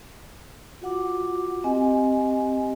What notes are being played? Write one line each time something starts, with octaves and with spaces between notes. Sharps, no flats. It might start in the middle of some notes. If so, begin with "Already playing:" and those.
F4 F#4 F#5 D6
C4 G4 D#5 F#5 G#5